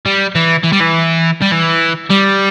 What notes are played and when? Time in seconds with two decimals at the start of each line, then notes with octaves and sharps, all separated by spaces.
0.06 G3
0.35 E3
0.64 E3
0.73 G3
0.81 E3
1.42 G3
1.52 E3
2.10 G3